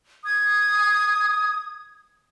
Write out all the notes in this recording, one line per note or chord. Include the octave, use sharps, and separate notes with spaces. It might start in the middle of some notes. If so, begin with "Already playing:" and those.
D#6 G#6